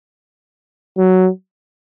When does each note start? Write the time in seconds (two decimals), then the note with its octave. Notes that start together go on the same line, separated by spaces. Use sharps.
0.98 F#3